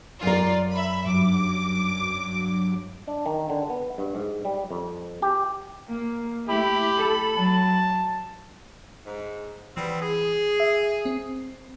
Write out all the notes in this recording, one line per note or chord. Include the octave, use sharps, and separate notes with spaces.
F#2 F4 A#4 D5
E5 B5
G2 F#3 D6
D4
D#3
D3
B3
G2
G#2
G3
F2
G4
A#3
A3 E4 G4 B5
A4
F#3 A5
G#2
E3 G3 B3 C4
G#4
E5
C4